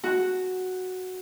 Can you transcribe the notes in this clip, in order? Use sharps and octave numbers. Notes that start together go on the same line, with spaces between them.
F#4